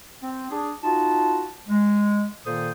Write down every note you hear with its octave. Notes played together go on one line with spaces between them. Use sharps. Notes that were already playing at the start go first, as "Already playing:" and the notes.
C4
D4 G#4
D#4 F4 F#4 A5
G#3
A#2 D#3 A#3 A4 C5 D#6